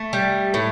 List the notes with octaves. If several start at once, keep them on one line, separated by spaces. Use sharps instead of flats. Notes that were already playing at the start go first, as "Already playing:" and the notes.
Already playing: A3
G3
A2